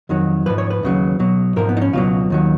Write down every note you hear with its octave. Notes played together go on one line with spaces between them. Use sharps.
F2 D#3 F#3
G#2 F3 B4
C#5
B4
D#2 C#3 F#3
B1 B2 F#3
G#2 F3 A#4
B3
D#4
C#4
C#2 B2 F#3 F4
D#2 D#3 F#3